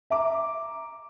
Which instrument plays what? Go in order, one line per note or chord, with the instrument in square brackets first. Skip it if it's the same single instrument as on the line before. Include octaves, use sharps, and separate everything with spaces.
[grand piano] E5 A#5 D6